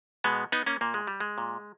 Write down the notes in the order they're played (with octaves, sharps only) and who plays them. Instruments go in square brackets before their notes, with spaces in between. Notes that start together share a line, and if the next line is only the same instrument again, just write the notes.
[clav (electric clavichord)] B2 G#3 B3
B3 D#4
A#3 C#4
A#2 A#3
G#3
G3
G#3
A#2